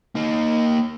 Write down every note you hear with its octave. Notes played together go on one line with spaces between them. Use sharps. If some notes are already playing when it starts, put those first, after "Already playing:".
A#3 D#4